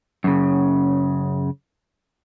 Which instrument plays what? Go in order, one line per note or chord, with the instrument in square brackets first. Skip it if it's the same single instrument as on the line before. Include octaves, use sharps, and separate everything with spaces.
[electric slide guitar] F#2 C#3